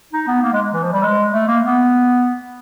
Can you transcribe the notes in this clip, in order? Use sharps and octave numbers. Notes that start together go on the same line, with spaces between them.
D#4
B3
A#3
G#3
E3
F3
G3
G#3
A3
A#3
B3